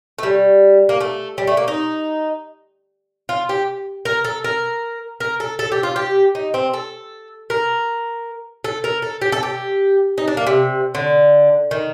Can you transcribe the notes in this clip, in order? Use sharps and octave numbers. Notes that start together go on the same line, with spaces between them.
A3
G3
A#3
A3
G3
A3
A#3
D#4
F4
G4
A#4
A4
A#4
A#4
A4
A4
G4
F4
G4
D#4
C4
A4
A#4
A4
A#4
A4
G4
A4
G4
D#4
D4
A#3
C3
D3
D#3